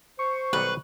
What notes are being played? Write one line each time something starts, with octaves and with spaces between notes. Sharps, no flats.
C5 C#6
B1 D#3 G3 B4